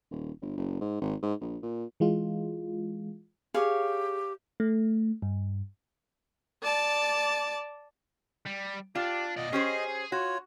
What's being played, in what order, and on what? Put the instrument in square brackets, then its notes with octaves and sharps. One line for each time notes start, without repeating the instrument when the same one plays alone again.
[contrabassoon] D#1
G1
F#1
G#2
G#1
G#2
A#1
A#2
[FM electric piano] E3 G#3 F4
[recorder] G4 [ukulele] G#4 [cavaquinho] C#5 F5
[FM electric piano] A3
G2
[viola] D5 A5
[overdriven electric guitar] G3
[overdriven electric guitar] D4 [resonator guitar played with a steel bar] F4 [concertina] G4
[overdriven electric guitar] B2 D5 [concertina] D#5
[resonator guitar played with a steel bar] C#4 G4 C5 [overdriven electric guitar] G#4
[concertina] F4 C#5 [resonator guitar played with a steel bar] F#4